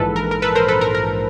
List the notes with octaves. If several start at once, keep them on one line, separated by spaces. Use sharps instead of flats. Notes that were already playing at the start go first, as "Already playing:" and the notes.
Already playing: A#1 G#2 E3 A4 B4
A#4
A#4
A4 B4
A#4 C5
A4 B4
A#4
A#4